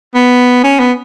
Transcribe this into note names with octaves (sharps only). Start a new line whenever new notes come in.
B3
C#4
B3